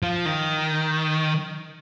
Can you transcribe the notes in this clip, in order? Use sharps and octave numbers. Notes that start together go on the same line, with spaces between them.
F3
D#3